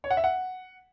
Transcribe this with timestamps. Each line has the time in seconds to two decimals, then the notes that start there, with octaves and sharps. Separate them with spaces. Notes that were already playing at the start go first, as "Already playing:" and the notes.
0.04 C#5
0.11 F#5
0.17 E5
0.24 F#5